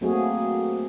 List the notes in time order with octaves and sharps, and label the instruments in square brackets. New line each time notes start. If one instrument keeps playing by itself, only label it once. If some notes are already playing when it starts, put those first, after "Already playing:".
[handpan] F#3 A3 A#3 C4 F#4 G#4